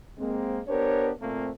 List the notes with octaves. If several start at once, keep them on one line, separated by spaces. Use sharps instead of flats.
G#3 A#3 C4
B3 D4 G4 A#4 C5 C#5
A#2 A3 A#3 C4